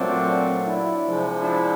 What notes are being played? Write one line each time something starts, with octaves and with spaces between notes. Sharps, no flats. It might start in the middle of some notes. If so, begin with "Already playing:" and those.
Already playing: A#2 F#3 A3 C4 D4
D4 E4
C3 F3 G#3
D4 E4